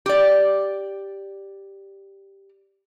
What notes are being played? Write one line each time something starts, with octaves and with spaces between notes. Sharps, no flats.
G4 D5